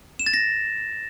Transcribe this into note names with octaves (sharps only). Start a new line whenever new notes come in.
E7
A6
A#6